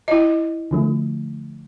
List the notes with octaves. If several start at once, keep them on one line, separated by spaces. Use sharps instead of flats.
E4 D#5
D3 F3 A3